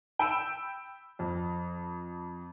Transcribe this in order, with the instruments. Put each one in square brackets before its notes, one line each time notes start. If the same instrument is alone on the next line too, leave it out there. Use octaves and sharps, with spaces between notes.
[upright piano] G5 B5 E6 D7 E7
F2